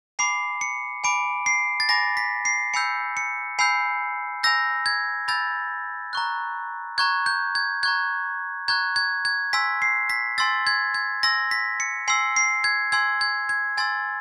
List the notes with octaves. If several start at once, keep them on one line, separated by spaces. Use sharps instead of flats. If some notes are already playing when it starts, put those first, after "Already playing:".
G#5 B5 D6 C7
C#7
G#5 B5 D6 D7
C7
A6
G#5 B5 D6 A#6
B6
C7
G#5 B5 E6 G6 C#7
C#7
G#5 B5 E6 G6 C7
G#5 B5 E6 G6 A#6
G#6
G#5 B5 E6 G6 A6
A#5 C#6 F#6
A#5 C#6 F#6 G#6
G6
G#6
A#5 C#6 F#6 G#6
A#5 C#6 F#6 G#6
G#6
G#6
G#5 C6 E6 B6
C7
B6
G#5 C6 E6 A6
G#6
G#6
G#5 C6 E6 A#6
B6
C#7
G#5 C6 E6 C7
C7
G#6
G#5 C6 E6 G#6
G#6
G#6
G#5 C6 E6 A6